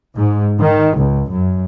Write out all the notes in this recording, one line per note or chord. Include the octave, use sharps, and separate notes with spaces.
G#2
D#3
C#2
F#2